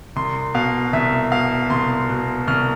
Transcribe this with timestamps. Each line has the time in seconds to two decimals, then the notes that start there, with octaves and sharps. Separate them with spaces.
0.16 C2 C6
0.54 B2 F5
0.93 C2 E5
1.32 B2 F5
1.70 C2 C6
2.09 B2
2.47 C2 F6